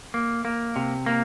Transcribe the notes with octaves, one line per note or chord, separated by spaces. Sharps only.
A#3
A#3
C3
A#3